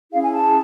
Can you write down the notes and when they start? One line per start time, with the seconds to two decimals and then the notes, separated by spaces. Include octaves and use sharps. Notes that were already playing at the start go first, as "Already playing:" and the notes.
0.12 C#4 E4 G#4 F5
0.22 G#5
0.34 A5